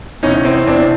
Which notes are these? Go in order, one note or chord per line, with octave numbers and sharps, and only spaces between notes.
E2 C3 E3 C#4 D#4
C#4
C4
E2 C3 E3 C4 D4